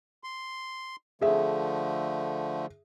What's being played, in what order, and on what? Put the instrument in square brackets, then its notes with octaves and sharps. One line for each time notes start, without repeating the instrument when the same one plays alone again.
[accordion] C6
[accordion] D3 F3 A3 [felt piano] G#4 E5